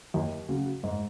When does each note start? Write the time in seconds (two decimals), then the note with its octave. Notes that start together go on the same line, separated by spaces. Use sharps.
0.14 D#2
0.49 C#3 F#3
0.83 G#2